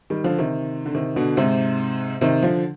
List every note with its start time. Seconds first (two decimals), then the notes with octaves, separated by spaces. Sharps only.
0.10 D#3 G3
0.24 D3 F3
0.38 C3 D#3
0.86 D3
0.95 C3 D#3
1.16 B2 D3
1.37 G#2 C3
2.21 C3 D#3
2.43 D3 F3